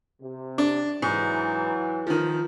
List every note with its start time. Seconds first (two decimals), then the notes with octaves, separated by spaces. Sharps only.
0.22 C3
0.58 D4
1.02 G#2 E3 F#3
2.07 D#3 F3